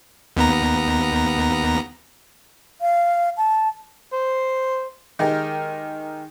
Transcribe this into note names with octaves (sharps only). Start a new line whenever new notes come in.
D#2 B3 A#5
F5
A5
C5
D#3 G#3 D#4 G4 A#4